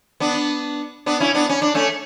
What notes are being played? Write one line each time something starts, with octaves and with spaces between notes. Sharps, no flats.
B3 D4
B3 D4
C#4 E4
B3 D4
C#4
D4
A3 C#4